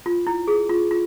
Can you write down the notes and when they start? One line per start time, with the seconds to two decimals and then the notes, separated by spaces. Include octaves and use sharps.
0.06 F4
0.27 E4
0.48 G#4
0.69 F4
0.91 F4